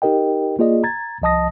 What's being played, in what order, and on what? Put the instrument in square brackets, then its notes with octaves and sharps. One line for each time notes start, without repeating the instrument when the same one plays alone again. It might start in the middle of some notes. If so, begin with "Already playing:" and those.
[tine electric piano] D#4 G4 A#4 D#5 G5
A#3 F4 G#4 D5 D#5
A#5 G#6 A6
C2 F3 D#5 A5 D#6 A#6